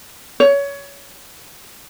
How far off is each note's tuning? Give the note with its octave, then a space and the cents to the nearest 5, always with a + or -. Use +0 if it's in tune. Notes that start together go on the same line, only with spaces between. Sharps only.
C#5 +20